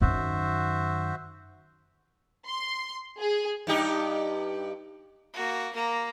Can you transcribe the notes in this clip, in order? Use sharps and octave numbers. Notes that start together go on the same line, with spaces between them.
F#2 D#3 F#4 C5 E5
C6
G#4
G2 D#4 G4
A#3 F#4
A#3 A#5